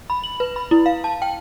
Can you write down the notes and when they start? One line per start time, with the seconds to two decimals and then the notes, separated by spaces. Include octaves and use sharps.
0.10 B5
0.24 F#7
0.40 B4
0.56 B5
0.71 E4
0.86 F5
1.04 A5
1.22 G5